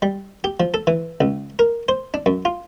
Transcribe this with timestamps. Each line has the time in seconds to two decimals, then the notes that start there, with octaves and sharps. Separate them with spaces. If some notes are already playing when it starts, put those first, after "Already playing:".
0.02 G3
0.44 G4
0.60 F3
0.74 A4
0.87 E3
1.21 C#2
1.59 A#4
1.88 C5
2.14 D4
2.26 F#2
2.45 F4